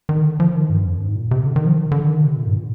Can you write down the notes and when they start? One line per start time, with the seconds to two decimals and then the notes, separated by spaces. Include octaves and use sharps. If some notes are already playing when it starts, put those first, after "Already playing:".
0.09 D#3
0.25 D3
0.40 F3
0.55 D#3
0.70 G2
0.85 F2
0.95 G2
1.05 G#2
1.15 A#2
1.31 C3
1.46 D3
1.56 D#3
1.66 F3
1.76 D#3
1.92 D3
2.07 D#3
2.21 C3
2.37 A#2
2.47 G2
2.57 A#2